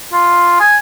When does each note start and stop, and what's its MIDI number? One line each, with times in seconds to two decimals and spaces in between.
0.13 0.60 65
0.60 0.76 80